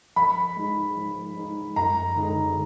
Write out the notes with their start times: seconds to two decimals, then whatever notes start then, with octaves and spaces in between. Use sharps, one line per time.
0.16 F3 B5
0.57 G#3 D#4
0.97 F3
1.37 G#3 D#4
1.76 F#2 A#5
2.16 D3 G#3 D#4